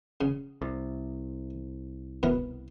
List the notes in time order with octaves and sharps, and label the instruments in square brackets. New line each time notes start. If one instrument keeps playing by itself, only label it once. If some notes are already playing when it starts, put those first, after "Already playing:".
[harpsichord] C#3
[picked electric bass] C2
[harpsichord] B2 E4 A#4